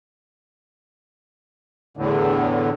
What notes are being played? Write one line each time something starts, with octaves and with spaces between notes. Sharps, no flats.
E2 A2 D3